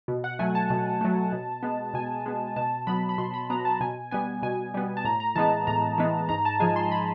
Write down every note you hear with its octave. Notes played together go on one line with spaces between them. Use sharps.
B2
F#5
F#3 A3 G#5
A5
B2
F#3 A3
B2
G#3 B3
B2 G#5
G#3 B3
B2 A5
F#3 B3 B5
B5
B2 C6
B5
F#3 B3 A#5
A5
B2 G#5
G3 B3 G#5
B2 G#5
G3 B3
A5
A2 A#5
A#5
E3 G#3 B3 A5
A2 A#5
E3 G#3 B3
G#2 A#5
A5
F3 G#3 G#5
C6
B5